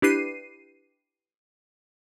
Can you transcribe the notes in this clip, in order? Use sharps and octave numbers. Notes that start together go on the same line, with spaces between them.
D4 E4 G4 B4 C7 D#7